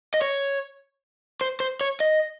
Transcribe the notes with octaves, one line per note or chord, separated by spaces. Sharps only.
D#5
C#5
C5
C5
C#5
D#5